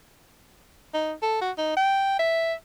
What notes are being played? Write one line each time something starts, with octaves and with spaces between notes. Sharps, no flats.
D#4
A4
F#4
D#4
G5
E5